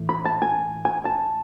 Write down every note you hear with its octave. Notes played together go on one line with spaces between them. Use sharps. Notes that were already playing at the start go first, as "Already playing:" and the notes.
Already playing: A2 E3
B5
A5
G#5
G#5
A5